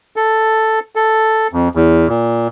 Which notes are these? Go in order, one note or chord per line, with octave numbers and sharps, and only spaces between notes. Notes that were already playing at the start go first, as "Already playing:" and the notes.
A4
A4
F2
E2
A#2